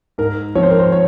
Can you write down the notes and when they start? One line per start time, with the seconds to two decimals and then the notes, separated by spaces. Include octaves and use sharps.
0.18 G#2 A#4
0.55 F3 C4 C#5
0.63 C5
0.71 A#4
0.79 C5
0.92 C#5